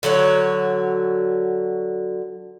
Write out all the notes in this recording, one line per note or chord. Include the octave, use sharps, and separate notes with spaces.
D3 F#3 F#4 C#5